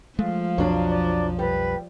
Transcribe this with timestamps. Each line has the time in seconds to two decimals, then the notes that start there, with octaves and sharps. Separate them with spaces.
0.19 F3 G#3 A3 F5
0.58 B1 F2 F#3 D4
0.89 D5
1.39 G3 B4